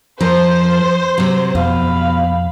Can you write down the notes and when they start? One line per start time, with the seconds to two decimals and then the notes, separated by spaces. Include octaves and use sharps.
0.20 F2 F3 A#4 C5
1.18 C3 F#3
1.55 F2 B2 F5 B5